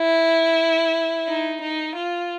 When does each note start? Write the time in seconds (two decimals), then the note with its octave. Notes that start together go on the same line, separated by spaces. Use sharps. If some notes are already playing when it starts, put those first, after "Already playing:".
Already playing: E4
1.28 D#4
1.61 D#4
1.95 F4